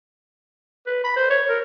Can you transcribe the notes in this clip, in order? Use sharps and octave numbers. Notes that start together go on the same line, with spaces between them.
B4
B5
C5
C#5
A#4